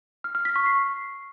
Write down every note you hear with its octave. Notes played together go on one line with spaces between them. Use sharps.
F6
F6
B6
C#6
C7